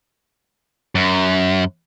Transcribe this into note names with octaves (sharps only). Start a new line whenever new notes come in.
F#2